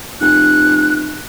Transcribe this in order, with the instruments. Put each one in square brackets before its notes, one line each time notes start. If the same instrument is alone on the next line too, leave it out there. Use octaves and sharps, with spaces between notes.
[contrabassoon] F1 [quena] F#6